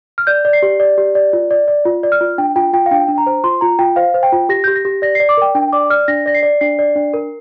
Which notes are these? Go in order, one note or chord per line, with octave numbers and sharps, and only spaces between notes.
F6
D5 G6
D5
C7
G4
D5
G4
D5
F4
D5
D5
F4
D5
F6
F4
D4 G5
F4 G5
F4 G5
F5
D4 G5
D4
A#5
C5
F4 C6
F4 A#5
F4 G5
C5 F5
C5
G5
F4
G4 A#6
G4 G6
A#6
G4
D5 A#6
D5 C7
D6
A#4 G5
D4 G5
D5 D6
D5 F6
D4 A#6
D5 A#6
C7
D5
D4 C7
D5
D4
A#4